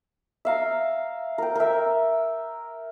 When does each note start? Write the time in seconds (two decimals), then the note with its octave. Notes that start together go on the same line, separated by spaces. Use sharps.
0.45 E5 F5 A#5
1.38 A#4 G5
1.55 A#4 E5